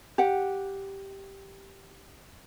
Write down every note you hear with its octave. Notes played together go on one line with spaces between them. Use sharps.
G4 F#5